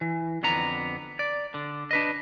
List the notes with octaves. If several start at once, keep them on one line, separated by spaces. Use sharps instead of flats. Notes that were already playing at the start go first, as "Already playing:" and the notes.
E3
F2 D3 B3 A#5
D5
D3
D4 B4 D#5